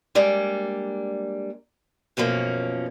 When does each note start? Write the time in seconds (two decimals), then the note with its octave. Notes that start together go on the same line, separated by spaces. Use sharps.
0.15 G3 G#3 A#3 D4
2.17 F#2 B2 F3 A#3 C#4